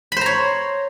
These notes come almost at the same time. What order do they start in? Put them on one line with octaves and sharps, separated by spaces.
B5 C5 A#5 C#5